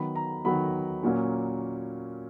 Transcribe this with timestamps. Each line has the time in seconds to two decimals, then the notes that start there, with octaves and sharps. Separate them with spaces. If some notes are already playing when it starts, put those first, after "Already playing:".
Already playing: D#3 F#3 B3 B5
0.15 A#5
0.44 D#3 F#3 B3 B5
1.03 A#2 F#3 A#3 C#4